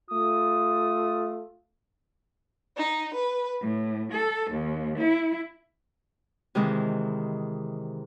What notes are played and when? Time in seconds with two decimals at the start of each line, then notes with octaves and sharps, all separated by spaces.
0.10 A3 F4 D#6
2.77 D#4
3.13 B4
3.60 A2
4.12 A4
4.51 D#2
4.98 E4
6.55 C3 D#3 E3 G#3